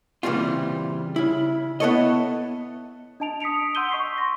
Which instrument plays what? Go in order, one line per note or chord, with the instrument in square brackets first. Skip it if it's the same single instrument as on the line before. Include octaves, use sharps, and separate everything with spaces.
[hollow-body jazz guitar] A#2 C#3 E3 G3 C4 F4
C#3 E4
B3 E4 A4 C#5 D#5
[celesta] D4 D#5 A5 D7 F7
D#6 B6 C#7 D7 F7
F#5 C6 E6 G6 D#7 G7
D#5 C#6 G6 B6 C7
C6 A#6